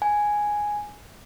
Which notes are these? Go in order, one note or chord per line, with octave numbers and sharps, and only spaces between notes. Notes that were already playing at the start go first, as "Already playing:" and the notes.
G#5